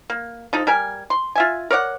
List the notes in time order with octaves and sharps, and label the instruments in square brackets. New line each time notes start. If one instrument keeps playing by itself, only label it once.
[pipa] A#3
F3 D#4 A4
G3 A#4 G#5
C6
F4 E5 G#5
A#4 C#5 D5 F#5